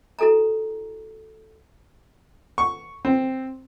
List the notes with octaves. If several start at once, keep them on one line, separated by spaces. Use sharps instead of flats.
E4 F#4 A4 G#5 A#5
C#6
C4